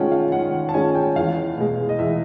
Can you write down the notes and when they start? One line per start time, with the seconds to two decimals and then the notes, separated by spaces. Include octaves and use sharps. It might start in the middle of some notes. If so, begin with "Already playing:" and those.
Already playing: D#3 G#3 C#4 F4 F#5 G5 A5
0.12 F5
0.32 D#3 F#5
0.53 F#5
0.69 A5
0.74 G#3 C#4 F4 G#5
0.95 G5
1.15 E2 F5
1.57 B2 G#3
1.89 D#5
1.99 E2 E5